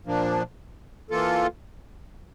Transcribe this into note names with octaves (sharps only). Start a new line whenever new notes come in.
A#2 F3 A#3 D4
E3 A#3 F4 A4